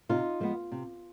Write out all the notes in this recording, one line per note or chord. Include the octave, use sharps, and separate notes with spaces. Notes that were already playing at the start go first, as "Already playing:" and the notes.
C3 D#4 F4
F3 G#3 B3
C3